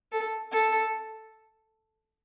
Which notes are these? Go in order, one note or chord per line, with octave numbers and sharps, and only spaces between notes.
A4
A4